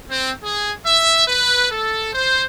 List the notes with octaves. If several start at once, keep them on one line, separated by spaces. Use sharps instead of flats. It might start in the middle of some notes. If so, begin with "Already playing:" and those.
C4
G#4
E5
B4
A4
C5